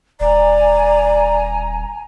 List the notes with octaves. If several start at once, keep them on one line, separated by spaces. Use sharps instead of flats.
D#1 D5 G#5 A#5